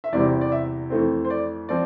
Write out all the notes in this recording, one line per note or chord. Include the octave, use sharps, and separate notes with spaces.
E5
E2 C3 E3 G3 C4 D5
D5
E5
F2 E3 A3 C4
C5
D5
F3 C4 D5